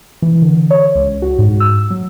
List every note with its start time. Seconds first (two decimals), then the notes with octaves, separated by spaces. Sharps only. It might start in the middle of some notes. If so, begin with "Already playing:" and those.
0.22 E3
0.42 D3
0.71 C#5
0.95 C#2
1.22 F#4
1.38 G#2
1.60 E6
1.90 F#3